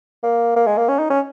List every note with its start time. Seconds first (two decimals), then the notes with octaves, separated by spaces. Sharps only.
0.23 A#3
0.56 A#3
0.67 G#3
0.77 A#3
0.88 C#4
0.99 D#4
1.10 C#4